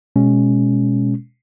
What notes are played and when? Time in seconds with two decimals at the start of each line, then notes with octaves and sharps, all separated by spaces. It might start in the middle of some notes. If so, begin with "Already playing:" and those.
0.16 B2 G#3 C#4